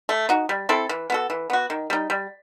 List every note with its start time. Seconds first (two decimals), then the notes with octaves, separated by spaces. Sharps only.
0.09 A3
0.29 D#4 F#4
0.49 G3
0.69 C4 E4 A4
0.89 E3
1.10 B3 F#4 A4
1.30 E3
1.50 B3 F#4
1.70 D#3
1.90 G3 D#4
2.10 G3